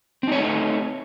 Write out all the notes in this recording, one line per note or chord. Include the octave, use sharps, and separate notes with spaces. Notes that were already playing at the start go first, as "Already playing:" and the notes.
A3 C4 D#4 C#5